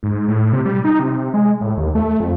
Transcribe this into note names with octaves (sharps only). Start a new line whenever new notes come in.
G#2
A2
C3
G3
D#4
C3
G#3
A2
D#2
A3
F2